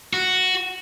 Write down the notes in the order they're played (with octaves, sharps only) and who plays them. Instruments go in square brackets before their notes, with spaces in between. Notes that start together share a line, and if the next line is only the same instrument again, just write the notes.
[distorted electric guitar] F#4